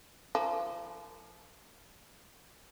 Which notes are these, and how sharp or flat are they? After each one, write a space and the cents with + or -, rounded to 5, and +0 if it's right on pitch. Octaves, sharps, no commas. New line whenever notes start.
F3 -35 A#4 -30